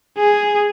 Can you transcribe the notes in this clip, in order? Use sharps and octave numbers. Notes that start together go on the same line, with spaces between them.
G#4